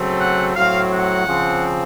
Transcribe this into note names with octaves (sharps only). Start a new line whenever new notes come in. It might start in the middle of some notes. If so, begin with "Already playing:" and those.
Already playing: C#3 F#3 A3 C4
F#5
A2 F#3 C4 F5
F#5
C#3 F3 C4